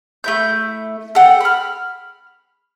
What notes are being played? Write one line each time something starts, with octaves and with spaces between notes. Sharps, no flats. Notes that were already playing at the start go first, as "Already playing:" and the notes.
A3 E4 G6
A4 F#5 G5
B5 F6